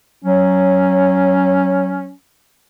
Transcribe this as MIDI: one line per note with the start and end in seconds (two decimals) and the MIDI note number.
0.25 2.12 54
0.25 2.13 61